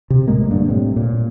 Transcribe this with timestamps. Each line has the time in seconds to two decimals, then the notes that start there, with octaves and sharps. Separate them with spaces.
0.10 C3
0.27 A#1 A2 G#3 A#3
0.51 G2 D3
0.68 A2 C3
0.96 A#2